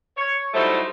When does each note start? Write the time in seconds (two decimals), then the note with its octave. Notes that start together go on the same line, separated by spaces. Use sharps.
0.17 C#5
0.54 F#3 G3 A3 D#4 E4 C5